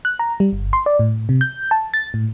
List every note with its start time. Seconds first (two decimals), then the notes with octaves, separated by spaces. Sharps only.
0.05 F#6
0.19 A#5
0.40 G3
0.53 G1
0.73 C6
0.86 D5
0.99 A2
1.29 C3
1.41 G6
1.71 A5
1.94 A6
2.14 A2